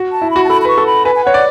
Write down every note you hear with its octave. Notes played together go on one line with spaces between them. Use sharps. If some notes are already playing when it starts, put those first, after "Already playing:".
Already playing: F#4
A5
E4
B5
F#4
A5
A4 B5
B5
B4 C#6
A4
B5
B4 G#5
G#5
C#5 F#5
D5